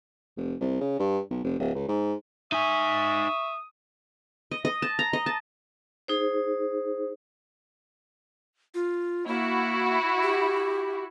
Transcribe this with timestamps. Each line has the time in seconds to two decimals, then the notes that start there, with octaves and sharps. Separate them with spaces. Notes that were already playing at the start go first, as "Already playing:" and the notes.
0.37 F1
0.60 C2
0.80 C#3
0.99 G2
1.30 B1
1.44 F1
1.59 D1
1.75 C#2
1.88 G#2
2.52 D#4 E5 G#5 C#6 D#6
4.51 D#5
4.65 D#5
4.82 A5
4.99 A#5
5.13 D#5
5.26 A5
6.08 D#4 G#4 C5
8.75 F4
9.28 A#3 E4 F#4
10.23 G4